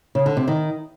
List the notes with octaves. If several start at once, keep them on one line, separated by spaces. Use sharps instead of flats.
C#3
D3
C3
D#3